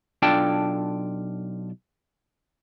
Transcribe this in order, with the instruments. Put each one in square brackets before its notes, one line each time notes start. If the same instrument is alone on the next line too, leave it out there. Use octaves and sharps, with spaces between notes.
[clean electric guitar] B1 D4 F4 A4 G5 A5